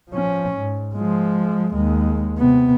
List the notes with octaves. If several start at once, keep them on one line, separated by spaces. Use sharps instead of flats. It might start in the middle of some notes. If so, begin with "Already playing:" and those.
F3 C#4
G#2
F3 G#3
D#2 G#3
C3 B3